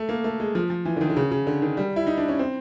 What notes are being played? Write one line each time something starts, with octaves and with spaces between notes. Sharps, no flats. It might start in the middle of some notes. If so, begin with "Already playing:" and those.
Already playing: A3
A#3
A3
G#3
F3
F3
E3
D3
D#3
D3
C#3
C#3
D3
D#3
G3
E4
D#4
D4
C#4
C4